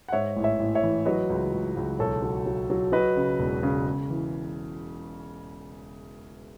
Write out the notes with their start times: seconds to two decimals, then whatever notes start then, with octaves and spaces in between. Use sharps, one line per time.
0.08 F#5
0.12 G#2 C#5 E5
0.36 A1
0.43 C#5 E5
0.59 A1
0.75 C#5 E5
0.83 E3
1.05 F#3 B4 D#5
1.30 C#2
1.53 C#2
1.77 C#2
1.99 B1 A4 C#5
2.22 F#3
2.46 F#3
2.70 F#3
2.92 F#3 B4 D#5
3.16 C#3
3.39 E1
3.63 C#3
3.87 C#3
4.10 E3